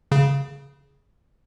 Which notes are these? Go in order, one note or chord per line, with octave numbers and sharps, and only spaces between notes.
C#3